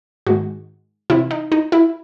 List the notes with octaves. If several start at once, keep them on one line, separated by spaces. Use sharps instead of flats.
G#2 D#3 G#3 F#4
C3 E3 C4 E4
D#4
D#4
E4